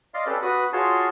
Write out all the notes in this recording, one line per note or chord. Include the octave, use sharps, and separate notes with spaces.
D5 D#5 F5 C6
C#4 G4 A4 B4 D5
F#4 B4 B5 D#6
F4 F#4 G#4 C#5 A5 C6